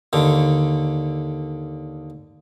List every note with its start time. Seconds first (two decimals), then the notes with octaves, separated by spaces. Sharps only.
0.13 D#2 D3